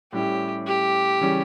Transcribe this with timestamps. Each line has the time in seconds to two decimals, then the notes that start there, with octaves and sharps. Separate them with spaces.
0.13 A2 G3 C#4 E4 G4
0.67 G4
1.20 C#3 E3 G3 C#4